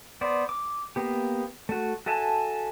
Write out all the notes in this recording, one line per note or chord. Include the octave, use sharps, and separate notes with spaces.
B3 C5 D5
D6
A#3 B3 G4
A3 F#4
F#4 A4 E5 G#5 A5